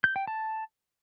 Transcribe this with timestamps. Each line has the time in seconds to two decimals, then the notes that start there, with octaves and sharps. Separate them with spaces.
0.04 G6
0.16 G5
0.27 A5